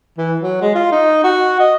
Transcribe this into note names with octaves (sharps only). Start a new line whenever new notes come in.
E3
F#3
G#3
F4
D#4
F#4
D#5